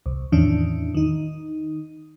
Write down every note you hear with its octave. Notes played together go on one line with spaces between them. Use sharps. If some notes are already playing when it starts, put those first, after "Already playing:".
C2
E2 A2 D#3 E3 C#4 D4
D#3 D#4